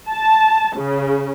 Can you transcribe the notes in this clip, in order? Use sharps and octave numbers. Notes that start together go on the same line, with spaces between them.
A5
C#3